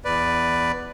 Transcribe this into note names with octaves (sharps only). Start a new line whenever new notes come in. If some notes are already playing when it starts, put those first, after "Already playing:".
E2 B4 D5